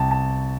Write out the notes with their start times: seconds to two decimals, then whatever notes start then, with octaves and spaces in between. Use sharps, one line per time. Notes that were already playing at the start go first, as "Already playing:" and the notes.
Already playing: C2 G5 A5
0.11 A5